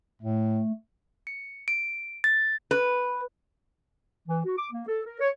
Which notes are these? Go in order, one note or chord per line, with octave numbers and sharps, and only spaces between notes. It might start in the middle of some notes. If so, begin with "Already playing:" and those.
A2 A3
C#7
D7
A6
B4
E3
F#4
D6
A#3
A4
A#4
C#5